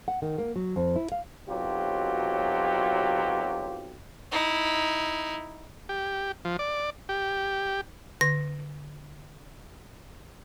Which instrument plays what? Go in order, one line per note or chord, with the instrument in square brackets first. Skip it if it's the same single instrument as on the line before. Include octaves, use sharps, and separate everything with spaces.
[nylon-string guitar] F#5
D#3
A#3
F#3
F2
E4
F5
[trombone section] B1 C3 F#3 F4 G4
[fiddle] D#4 E4
[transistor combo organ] G4
F3
D5
G4
[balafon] D3 [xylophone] A#6